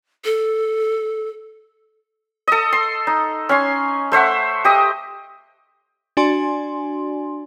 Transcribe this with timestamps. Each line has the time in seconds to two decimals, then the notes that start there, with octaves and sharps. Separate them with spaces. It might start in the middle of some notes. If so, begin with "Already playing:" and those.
0.24 A4
2.47 A4 D#5
2.73 C6
3.07 D#4
3.49 C#4 G#5 C6
4.12 A3 C5 E5 F#5
4.65 G4 D#5
6.17 D4 F#4 D5 G#5 C6